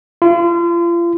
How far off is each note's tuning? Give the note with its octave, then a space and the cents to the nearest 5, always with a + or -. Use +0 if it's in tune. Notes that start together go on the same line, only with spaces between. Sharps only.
F4 -35